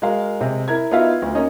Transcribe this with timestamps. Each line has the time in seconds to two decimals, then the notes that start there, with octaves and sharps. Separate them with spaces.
0.02 G#3 F#4 A#4 F5
0.41 C3 G#3
0.68 E4 A#4 G#6
0.91 B3 D#4 F4 F#4 E5 F5
1.22 D2
1.35 A#3 C#4 D#4 D#5